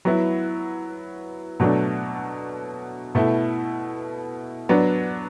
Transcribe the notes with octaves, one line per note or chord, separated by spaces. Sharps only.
F#3 B3 E4
B2 F#3 A3 D4
B2 A3 E4
F#3 B3 D4